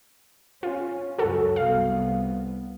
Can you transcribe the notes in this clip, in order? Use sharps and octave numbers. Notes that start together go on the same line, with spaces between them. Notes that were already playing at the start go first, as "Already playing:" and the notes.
C#4 F4
C#2 F#2 F#4 A4
C2 B3 F5